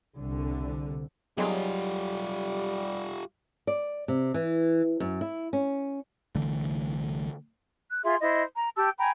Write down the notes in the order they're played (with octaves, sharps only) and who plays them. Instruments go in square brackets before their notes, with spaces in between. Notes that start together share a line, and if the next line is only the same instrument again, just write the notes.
[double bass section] C2 D3
[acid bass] F#3 [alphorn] G3 [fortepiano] D#4 G#4 C6 [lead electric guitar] F4 G4
[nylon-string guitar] D5
C3
E3
F#2
E4
C#4
[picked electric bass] C2 D3 E3 A3
[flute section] F#6
F4 G#4 E5 C6
E4 C5 D#5
A#5
G4 G5 A5 E6
G5 G#5 A#5 B5